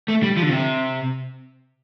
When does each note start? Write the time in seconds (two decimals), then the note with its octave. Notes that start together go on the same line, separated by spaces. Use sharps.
0.08 A3
0.23 G3
0.37 F3
0.42 D3
0.49 C3